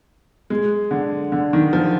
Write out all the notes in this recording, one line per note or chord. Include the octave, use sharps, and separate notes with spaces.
G#3
D3
D3
D#3
F3